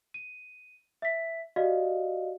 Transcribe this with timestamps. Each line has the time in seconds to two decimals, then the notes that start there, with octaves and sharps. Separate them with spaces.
0.14 D#7
1.02 E5 B6
1.56 F#4 G4 D5 D#5 F5